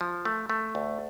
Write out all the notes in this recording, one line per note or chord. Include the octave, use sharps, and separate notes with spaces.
F3
A3
A3
D2